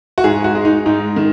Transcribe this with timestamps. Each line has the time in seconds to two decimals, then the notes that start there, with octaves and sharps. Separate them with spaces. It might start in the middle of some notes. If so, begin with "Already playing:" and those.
0.18 F#4
0.24 G#2 G#4
0.44 F#4
0.55 G#3
0.65 D#4
0.86 G#2 D#4
1.16 D#3